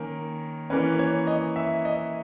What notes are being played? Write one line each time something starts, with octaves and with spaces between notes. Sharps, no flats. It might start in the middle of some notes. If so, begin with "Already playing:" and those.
Already playing: D#3 A#3 C#4
E3 A#3 C#4 B4
C#5
D#5
E5
D#5